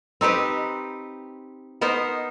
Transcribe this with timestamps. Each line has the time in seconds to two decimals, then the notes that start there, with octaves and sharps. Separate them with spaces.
0.21 C4 D#4 G4 B4
1.81 B3 D#4 A#4 C5